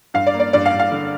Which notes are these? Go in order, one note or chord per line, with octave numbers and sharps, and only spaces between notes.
G2 F5
D5
A#3
D5
G2 D5
F5
G2
F5
D3